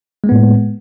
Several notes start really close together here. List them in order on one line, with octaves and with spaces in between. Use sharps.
G#3 A#3 B3 A2